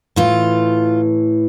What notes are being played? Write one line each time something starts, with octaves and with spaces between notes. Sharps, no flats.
A2 E3 F4